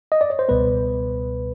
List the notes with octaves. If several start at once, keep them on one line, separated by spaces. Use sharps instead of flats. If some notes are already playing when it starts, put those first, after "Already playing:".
D#5
D5
C#5
C5
C#2 B2 G3 B3 B4